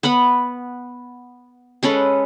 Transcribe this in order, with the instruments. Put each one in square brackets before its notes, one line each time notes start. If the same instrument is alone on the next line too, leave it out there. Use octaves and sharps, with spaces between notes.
[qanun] B3 B4 F#5 B5
G#3 C#4 A4 B4